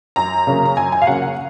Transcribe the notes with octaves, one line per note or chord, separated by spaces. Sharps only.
F#2 A#5
C#3 F#3 A#3 C#4
A#5
F#2 G#5
G#5
F5
C#3 F#3 A#3 C#4 F#5
F#5